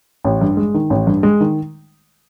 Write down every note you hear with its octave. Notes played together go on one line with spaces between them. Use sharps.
A1
G2
G#3
D#3
A1
G2
G#3
D#3